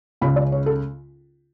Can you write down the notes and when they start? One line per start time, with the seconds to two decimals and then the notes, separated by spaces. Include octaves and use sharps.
0.21 C#2 C#3 B5
0.36 D5
0.52 C#5
0.66 A4